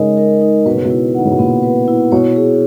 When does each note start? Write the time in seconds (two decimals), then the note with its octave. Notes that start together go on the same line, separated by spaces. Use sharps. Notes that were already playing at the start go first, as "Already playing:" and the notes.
Already playing: C#3 G#3 D#4 A#4 D#5
0.18 A#4
0.41 D#4
0.66 B2 B4
0.76 C#3
0.85 B2
0.90 E4
1.14 D#3 F#5
1.25 C#3
1.31 B2
1.39 A#2 B3
1.63 B4
1.88 E4
2.12 B2 C#5
2.36 G#4